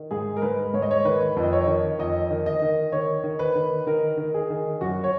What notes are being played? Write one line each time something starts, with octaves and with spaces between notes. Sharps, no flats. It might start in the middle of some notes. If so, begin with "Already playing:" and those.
Already playing: D#3
G#2 G#4
A#4
G#2 B4
G#2 C#5
D#5
C#5
D#3 B4
F2
D#5
C#5
D#3
F2 D#5
D#3
D#5
D#3
D#3 C#5
D#3
B4
D#3
D#3 A#4
D#3
G#4
D#3
F#2 F#4
C#5